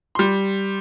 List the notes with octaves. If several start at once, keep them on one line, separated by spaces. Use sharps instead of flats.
G3 C6